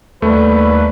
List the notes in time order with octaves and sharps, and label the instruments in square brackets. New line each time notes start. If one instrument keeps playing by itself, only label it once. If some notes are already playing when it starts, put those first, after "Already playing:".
[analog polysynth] D#2 [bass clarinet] G3 [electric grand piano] A3 [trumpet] B4